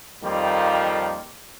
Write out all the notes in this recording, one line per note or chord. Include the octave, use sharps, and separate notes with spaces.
F2 D#3 F3 G3 A#3